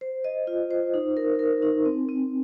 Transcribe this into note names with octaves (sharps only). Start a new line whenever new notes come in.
C5
D#5
F4
C5
D#4
A#4
A#4
D#4
C4
C4